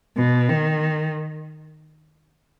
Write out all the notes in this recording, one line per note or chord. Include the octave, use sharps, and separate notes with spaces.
B2
D#3